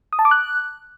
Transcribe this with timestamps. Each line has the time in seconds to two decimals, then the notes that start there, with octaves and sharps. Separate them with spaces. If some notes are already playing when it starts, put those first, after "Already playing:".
0.13 D#6
0.19 A5
0.25 D6
0.31 F#6